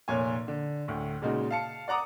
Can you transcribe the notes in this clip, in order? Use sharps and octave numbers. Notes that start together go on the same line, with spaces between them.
F1 A#2 C#5 G#5
D3
D2 A2
A#2 C#3 G#3 D#4 F#4
F5 A5 C#7
D5 F#5 A#5 D6 D#6